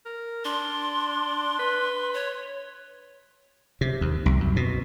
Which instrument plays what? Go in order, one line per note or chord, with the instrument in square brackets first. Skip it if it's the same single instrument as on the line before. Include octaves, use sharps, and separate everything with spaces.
[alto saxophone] A#4
[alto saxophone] D4 [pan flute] C6
[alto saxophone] B4
[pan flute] C#5
[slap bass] C3
D#2
C2
F#2
B2